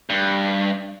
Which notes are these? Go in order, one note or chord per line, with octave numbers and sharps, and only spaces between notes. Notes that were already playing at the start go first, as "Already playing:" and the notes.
G2